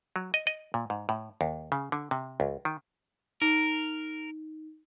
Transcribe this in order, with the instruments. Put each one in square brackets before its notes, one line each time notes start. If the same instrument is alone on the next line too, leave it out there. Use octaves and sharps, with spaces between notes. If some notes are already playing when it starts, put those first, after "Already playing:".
[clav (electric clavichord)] F#3
D#5
D#5
A#2
G#2
A2
D#2
C#3
D3
C3
C#2
D#3
[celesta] D#4 [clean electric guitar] A#4